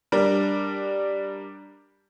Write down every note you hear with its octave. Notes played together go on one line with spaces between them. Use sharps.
G3 D4 A#4